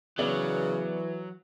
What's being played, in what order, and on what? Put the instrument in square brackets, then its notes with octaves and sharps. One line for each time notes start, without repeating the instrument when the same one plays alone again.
[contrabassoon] C#3 [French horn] E3 [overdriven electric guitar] F#3 [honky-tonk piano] B3 D5 F#7